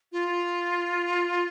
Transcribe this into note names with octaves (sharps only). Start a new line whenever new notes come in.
F4